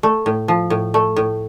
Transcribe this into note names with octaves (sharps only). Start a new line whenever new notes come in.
A3
A2
F3
A2
A3
A2